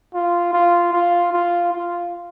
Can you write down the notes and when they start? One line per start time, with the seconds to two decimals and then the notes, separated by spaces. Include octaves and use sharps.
0.14 F4
0.53 F4
0.93 F4
1.33 F4
1.73 F4